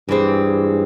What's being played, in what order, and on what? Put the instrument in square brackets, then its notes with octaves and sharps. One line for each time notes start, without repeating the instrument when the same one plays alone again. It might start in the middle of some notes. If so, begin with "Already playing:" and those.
[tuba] G2 [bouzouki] E3 G#3 C4